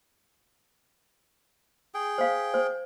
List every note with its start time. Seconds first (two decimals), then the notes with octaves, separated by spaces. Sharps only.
1.94 G#4 G5
2.18 C5 F5
2.54 C5